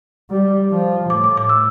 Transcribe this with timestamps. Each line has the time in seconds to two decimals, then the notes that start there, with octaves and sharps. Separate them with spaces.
0.30 G3
0.71 F3
1.10 A2 D6
1.24 D6
1.37 D6
1.49 E6